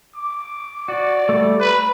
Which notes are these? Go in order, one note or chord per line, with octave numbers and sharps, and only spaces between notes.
D6
F#4 D5
G3 A3
B4 F#6